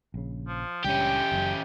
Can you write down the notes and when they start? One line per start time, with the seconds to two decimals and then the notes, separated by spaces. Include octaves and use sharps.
0.14 A#1 C#3
0.47 F3
0.84 C#2 G3 C#4 D4 G4 G5
1.32 F#1 F#2